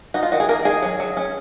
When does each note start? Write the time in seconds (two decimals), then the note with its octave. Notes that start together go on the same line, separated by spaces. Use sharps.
0.14 D#4 F#4
0.23 F4
0.32 D#3 F#4
0.40 G#4
0.49 A#3 A#4
0.65 D#3 G#4
0.83 F#3
1.00 F#3
1.17 C#4